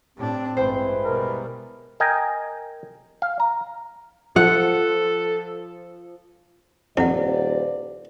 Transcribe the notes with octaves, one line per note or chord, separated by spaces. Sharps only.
A2 C4 D4 G4
A1 G2 G#3 E4 B4 C5 G5
B2 G3 A#4
A#4 D#5 G5 G#5
F5
A#5
F3 A4 F#5
D#1 F2 E4 C5 D5 F#5